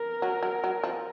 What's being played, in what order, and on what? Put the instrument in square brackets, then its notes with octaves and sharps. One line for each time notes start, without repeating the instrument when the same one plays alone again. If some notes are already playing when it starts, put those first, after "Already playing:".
Already playing: [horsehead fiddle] A#4
[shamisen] F#3
F#3
F#3
F3